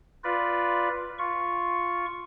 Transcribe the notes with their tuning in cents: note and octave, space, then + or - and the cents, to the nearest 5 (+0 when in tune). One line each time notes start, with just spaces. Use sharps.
F4 +0 B4 +0 D5 +0
F4 +0 C#6 +0